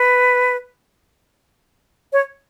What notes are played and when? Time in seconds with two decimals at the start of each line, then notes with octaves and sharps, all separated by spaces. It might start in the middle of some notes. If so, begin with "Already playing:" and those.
Already playing: B4
2.13 C#5